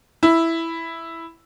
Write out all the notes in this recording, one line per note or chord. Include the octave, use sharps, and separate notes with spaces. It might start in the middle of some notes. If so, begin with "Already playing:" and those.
E4